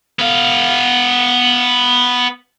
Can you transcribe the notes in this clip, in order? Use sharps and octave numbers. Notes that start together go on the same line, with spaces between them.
B3 F5